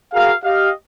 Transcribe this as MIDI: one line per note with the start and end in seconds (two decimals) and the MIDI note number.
0.14 0.33 66
0.14 0.33 68
0.14 0.33 70
0.14 0.33 77
0.44 0.71 67
0.44 0.71 75
0.44 0.71 77